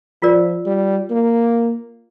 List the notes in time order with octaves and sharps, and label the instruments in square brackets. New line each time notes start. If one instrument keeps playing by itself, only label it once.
[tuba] F3 [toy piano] F4 A#4 D5
[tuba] G3
A#3